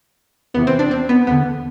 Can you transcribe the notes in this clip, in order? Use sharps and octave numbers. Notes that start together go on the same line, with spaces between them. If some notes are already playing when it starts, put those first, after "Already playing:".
E2 C3 E3 B3
C4
D4
C4
B3
E2 D3 B3